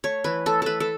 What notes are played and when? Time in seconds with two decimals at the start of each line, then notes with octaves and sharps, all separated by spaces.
0.04 A3 C#5
0.24 E3 B4
0.46 A3 A4
0.62 A3 A4 B4
0.80 A4